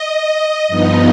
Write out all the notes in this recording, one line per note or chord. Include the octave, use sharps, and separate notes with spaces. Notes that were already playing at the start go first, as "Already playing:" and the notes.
Already playing: D#5
G2 F3 B3 D#4 D#5